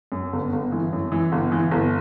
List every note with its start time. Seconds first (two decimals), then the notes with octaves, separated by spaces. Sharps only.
0.12 F#2
0.33 G1
0.53 G1
0.72 E3
0.93 F#2
1.12 E3
1.32 G1
1.52 E3
1.71 G1